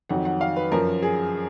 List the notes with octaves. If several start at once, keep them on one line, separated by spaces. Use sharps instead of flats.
F2 D#3 F#3 F#5
F#5
F5
B4
F#2 F3 A#4
G#4